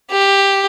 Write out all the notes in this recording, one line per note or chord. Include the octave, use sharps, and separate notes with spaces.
G4